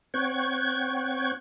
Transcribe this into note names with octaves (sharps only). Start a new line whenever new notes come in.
C4 C#5 F#5 G5 G#6